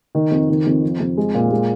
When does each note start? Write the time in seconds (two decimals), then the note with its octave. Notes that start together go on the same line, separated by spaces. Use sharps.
0.15 D#3
0.31 F2
0.49 D#3
0.66 F2
0.83 F3
1.00 F2
1.17 G#3
1.34 A#2
1.51 G#3